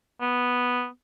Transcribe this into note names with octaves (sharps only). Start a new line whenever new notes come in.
B3